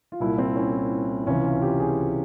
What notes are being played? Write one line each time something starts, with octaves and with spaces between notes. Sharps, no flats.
F4
C2 A#2 E4
C4
C#4
C#2 C3 E3 C#4
F4
G4
G#4